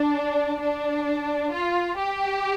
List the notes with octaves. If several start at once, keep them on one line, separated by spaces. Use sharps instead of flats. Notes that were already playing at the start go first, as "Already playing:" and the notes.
Already playing: D4
D4
F4
G4